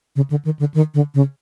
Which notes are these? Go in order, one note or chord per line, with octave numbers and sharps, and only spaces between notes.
C#3
D3
D#3
D3
D#3
D3
C#3